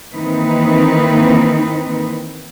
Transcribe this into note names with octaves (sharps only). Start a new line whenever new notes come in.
D#3 E3 A#3 C4 D#4 B4